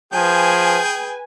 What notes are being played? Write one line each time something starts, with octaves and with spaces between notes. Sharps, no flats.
F3 G#4 B4 G5 G#5